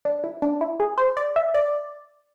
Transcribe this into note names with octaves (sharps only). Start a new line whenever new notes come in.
D4
E4
D4
E4
G#4
C5
D5
E5
D5